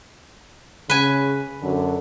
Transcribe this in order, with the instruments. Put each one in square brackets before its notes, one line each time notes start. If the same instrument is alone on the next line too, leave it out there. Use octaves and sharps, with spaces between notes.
[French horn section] C#3 [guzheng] B4 G#5
[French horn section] F#2 D3